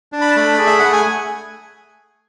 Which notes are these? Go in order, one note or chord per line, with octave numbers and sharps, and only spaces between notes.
D4
B5
A5
A3 B5
G#4 D5
E5
A3 F#5
G#5